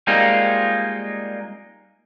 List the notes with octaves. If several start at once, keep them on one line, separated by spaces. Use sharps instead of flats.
G3 G#3 A#3 C4 D#4 F4